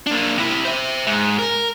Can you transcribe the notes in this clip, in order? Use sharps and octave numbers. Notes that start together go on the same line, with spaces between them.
A#3 D4
C3 E4
C5 E5
G#2
A#4